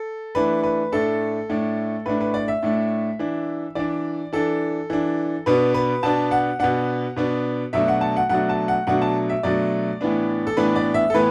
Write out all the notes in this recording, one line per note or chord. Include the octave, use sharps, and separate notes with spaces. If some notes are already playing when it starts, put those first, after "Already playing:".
Already playing: A4
E3 A3 D4 B4
B4
A2 A3 D4 A4
A2 A3 D4
A2 A3 D4 B4
B4
D5
E5
A2 A3 D4
E3 D4
E3 D4 D5
E3 D4 A4
E3 D4
B2 B3 D4 B4
B4
B2 B3 D4 A5
F#5
B2 B3 D4 F#5
B2 B3 D4
B2 F#3 A3 D4 E5
F#5
A5
F#5
B2 F#3 A3 D4 F#5
A5
F#5
B2 F#3 A3 D4 F#5
A5
E5
B2 F#3 A3 D4 D5
A2 E3 B3 D4
A4
A2 E3 B3 D4 B4
D5
E5
A4
A2 E3 B3 B4